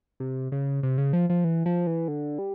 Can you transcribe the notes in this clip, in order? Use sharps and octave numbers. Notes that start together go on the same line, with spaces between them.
C3
C#3
C3
C#3
F3
F3
E3
F3
E3
D3
G3